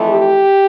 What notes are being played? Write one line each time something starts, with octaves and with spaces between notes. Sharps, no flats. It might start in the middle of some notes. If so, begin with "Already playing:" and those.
Already playing: F2 E3 A3
G4